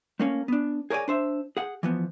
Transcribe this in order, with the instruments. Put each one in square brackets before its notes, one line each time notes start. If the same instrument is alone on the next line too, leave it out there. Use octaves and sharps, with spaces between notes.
[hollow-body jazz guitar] A3 A#3 C#4
B3 D4
G#4 A#4 C#5 D5 G#5
D4 C5 E5
G#4 F#5
E3 F3 B3